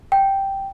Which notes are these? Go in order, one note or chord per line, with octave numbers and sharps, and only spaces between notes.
G5